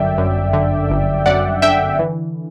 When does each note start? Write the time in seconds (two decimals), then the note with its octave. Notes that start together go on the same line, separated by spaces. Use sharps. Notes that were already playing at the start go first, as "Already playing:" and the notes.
Already playing: G1 F#2 D3 D5 E5 G5
0.18 F#2
0.53 D3
0.90 G1
1.26 F#2 D5 F#5
1.62 D3 E5 G5
1.99 E3